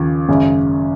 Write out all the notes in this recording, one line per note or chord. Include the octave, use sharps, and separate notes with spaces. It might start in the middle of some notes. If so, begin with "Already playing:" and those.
Already playing: D#2 C#3 F3
G#1 F#2 C#3